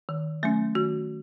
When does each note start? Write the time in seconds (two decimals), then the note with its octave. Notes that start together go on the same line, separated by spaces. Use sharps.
0.09 D#3
0.43 F#3 A3 C#4
0.75 D#3 F#4